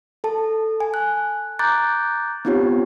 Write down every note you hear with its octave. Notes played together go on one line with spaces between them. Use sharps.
A4 A5
G#5
F#6
A#5 D6 F#6 G6 A6
B3 C4 D#4 F4 G4 C#5